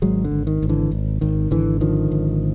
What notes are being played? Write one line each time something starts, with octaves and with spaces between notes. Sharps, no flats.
G#1 F#3 G#3
D3
G#1
D#3
G#1
D3 E3
G#1
G#1 D#3
G#1 D3 E3
D3 D#3 F3
G#1